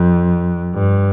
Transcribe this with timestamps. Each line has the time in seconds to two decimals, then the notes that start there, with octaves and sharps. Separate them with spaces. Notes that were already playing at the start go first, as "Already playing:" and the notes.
Already playing: F2
0.74 G2